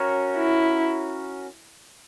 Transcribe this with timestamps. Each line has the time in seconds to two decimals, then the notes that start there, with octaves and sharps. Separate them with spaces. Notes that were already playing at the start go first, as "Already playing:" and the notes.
Already playing: C#4 F#4 A#4 C#5
0.38 E4